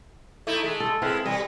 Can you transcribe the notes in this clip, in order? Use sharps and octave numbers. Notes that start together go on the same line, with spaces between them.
A3 D#4 E4
G#3 A3
A4
G#3 C4 E4 B4 F5
G3 G#4 C#5 D#5